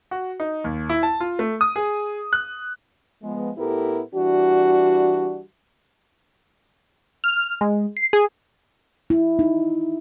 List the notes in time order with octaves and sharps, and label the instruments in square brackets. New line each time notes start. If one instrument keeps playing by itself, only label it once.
[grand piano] F#4
D#4
D#2
E4
A5
F4
A3
D#6
G#4
F#6
[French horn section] F3 G#3 B3
A2 B3 E4 G4 A4 A#4
E3 G3 D4 F#4
[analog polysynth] F6
G#3
C7
G#4
[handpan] E4
D#4